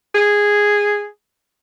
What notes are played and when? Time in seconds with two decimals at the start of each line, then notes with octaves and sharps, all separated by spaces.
0.15 G#4